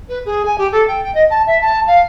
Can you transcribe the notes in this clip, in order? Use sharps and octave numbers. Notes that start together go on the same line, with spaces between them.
B4
G#4
G#5
G4
A4
G5
G5
D#5
A5
E5
A5
F5